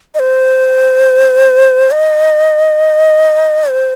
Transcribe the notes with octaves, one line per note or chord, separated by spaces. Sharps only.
D#5
C5
D#5
C5